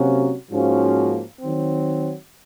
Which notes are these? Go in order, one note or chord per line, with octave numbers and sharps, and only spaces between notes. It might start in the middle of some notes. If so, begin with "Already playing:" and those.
Already playing: C3 F#3 A#3 C#4 F#4
G#2 F3 A#3 C#4 F#4
D#3 F#3 C4